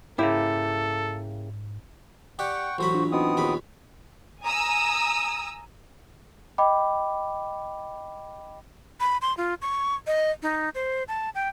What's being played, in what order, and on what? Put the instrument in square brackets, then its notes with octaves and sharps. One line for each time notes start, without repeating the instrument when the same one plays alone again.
[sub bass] G#2 [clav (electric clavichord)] C#3 A#3 G4 [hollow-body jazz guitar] E4 [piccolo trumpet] A4
[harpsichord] G4 D5 [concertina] F#5 G5 C#6
[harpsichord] A1 F#3 B5 [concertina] F#4 C5
[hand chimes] D4 F4
[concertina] B3 C4 D#6 [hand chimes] D#4 F#4 D#5
[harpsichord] A#1 D#2 B5
[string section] G#5 A#5 D#6 E6
[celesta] D#5 G5 B5 D6
[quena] B5
C6
F4
C#6
D#5
D#4
C5
A5
G5